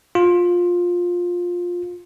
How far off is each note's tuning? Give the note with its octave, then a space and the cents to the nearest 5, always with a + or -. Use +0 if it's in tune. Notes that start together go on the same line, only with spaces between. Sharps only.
F4 +15